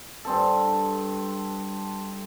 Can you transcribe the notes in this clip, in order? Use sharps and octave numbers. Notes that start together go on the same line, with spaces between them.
G2 C4 A4